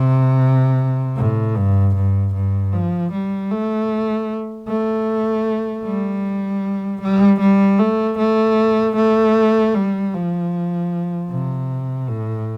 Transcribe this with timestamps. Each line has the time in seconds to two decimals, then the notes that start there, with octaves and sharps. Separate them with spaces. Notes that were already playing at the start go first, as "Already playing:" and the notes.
Already playing: C3
1.16 A2
1.55 G2
1.95 G2
2.34 G2
2.73 F3
3.12 G3
3.51 A3
4.67 A3
5.84 G3
7.01 G3
7.40 G3
7.79 A3
8.18 A3
8.96 A3
9.74 G3
10.14 F3
11.30 C3
12.08 A2